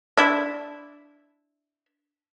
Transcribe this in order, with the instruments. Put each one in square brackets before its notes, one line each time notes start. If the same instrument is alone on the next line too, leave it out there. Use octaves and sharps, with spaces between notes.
[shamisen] D4 E4